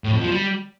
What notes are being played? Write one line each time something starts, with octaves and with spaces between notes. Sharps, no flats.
A2
F2
F3
G3